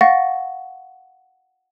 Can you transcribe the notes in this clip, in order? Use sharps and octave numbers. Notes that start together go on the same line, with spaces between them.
F5 F#5 C#6 A6 A#6